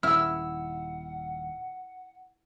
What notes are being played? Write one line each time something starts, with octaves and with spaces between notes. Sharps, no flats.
D#1 E4 F#5 E6 F6